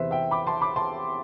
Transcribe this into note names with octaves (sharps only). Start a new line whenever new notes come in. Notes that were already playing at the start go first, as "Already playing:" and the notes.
Already playing: E2 C3 E3 B4 C5 E5
E5 G5
B5 D6
A5 C6
B5 D6
A5 C6